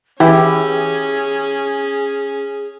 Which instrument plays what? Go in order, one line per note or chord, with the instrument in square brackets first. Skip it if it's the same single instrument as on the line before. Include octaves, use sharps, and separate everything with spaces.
[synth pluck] E3 [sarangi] C#4 [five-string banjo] E4 G4 [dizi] G#4